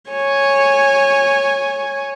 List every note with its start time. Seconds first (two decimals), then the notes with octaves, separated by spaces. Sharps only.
0.10 C#5 G#5